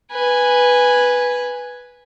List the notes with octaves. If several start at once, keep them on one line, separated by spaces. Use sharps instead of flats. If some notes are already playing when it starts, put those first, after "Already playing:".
B4 G#5